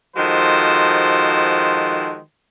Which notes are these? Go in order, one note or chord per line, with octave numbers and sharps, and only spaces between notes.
D#3 F3 G#3 F#4 A4 C5